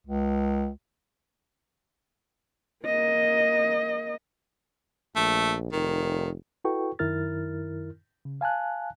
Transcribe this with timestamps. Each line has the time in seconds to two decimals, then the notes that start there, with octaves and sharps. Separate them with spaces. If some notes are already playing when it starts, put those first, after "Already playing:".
0.07 C#2
2.86 A#3 D#5
5.16 A#1 A3
5.72 F1 D#3
6.65 E4 F#4 A4 B4 G5 C#6
6.99 F#2 D#3 E4 A#4 F6 A6
8.25 C#3
8.41 F5 G#5 A5 F#6